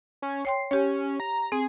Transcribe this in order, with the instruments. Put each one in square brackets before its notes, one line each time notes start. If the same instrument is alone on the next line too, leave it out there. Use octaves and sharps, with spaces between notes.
[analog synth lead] C#4
[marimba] C#5 G5 C6 [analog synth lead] C7
[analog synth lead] C#4 [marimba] G4 C#5
[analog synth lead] A#5
[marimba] C4 [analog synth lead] G#4